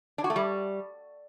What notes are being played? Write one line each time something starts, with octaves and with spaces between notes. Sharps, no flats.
D4
F#4
A3
G3